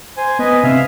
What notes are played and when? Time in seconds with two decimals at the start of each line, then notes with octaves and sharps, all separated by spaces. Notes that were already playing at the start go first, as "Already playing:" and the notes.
0.17 C5 G#5
0.39 B3 B4 D#5 G#5
0.63 C3 C4 E5 F5